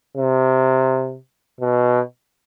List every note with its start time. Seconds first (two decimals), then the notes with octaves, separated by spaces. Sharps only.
0.17 C3
1.60 B2